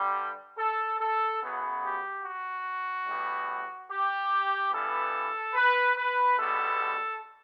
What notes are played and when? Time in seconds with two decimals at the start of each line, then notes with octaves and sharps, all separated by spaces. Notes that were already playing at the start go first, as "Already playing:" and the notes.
Already playing: G2 D3 G3
0.57 A4
0.99 A4
1.41 F#2 C#3 F#3 B3
1.82 G4
2.24 F#4
3.07 A2 G3 B3
3.89 G4
4.71 G2 E3 G3 B3 A4
5.54 B4
5.96 B4
6.37 C#2 B2 G3 B3 A4